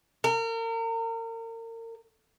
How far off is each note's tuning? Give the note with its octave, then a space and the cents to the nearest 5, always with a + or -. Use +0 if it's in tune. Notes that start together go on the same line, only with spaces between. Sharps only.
A#4 -35